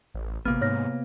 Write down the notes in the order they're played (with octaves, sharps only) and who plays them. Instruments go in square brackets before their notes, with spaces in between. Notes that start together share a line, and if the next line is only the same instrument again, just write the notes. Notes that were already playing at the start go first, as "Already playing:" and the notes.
[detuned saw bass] A1
[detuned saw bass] G#1 [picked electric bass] C3 A#3 B3 [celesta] F6
[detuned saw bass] G#2 [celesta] C#5 F6 A#6